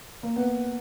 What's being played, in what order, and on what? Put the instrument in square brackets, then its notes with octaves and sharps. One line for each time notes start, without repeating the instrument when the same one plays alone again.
[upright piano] A#3
B3